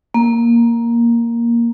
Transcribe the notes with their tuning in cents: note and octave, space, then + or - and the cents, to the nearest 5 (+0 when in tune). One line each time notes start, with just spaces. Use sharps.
A#3 +5